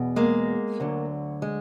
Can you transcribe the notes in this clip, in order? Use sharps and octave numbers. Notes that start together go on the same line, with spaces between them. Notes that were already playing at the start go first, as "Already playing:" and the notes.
Already playing: E2 B2
G#3 A#3
D2 D3 F#3
G#3